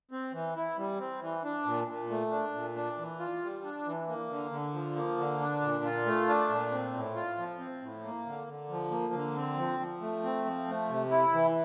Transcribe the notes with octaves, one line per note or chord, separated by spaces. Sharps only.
C4
E3
E4
G3
C4
E3
D4
A#2
A#2
A3
D4
A#2
D4
E3
F4
G3
D4
E3
A#3
D3
D3
F3
A#3
D3
D4
A#2
F4
A3
D4
A#2
C4
A2
F4
F3
C4
A2
A#3
D3
D3
F3
A#3
D3
C4
F3
F3
A3
C4
F3
A3
C3
E4
E3